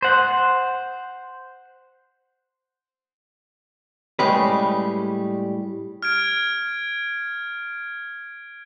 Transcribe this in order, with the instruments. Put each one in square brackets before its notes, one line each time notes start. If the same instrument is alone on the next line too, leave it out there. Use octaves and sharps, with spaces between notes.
[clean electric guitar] C5 F#5
[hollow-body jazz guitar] A2 G3 G#3 C#4 G#4 B4
[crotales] F6 G#6 D7